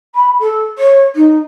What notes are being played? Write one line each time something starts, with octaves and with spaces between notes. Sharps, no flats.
B5
A4
C#5
D#4